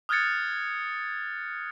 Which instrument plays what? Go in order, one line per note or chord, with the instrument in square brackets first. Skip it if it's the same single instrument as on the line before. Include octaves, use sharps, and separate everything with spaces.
[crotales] D#6 F6 F#6 G#6 A6 C#7